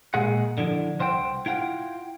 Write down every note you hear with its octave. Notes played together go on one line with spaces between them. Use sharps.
A#2 G#3 G#4 F#5
D3 F3 E4
C2 C5 F#5 G5
E4 F4 F#5 G5